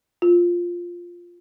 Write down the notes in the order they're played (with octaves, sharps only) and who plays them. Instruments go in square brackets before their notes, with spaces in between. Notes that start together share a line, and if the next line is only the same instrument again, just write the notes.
[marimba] F4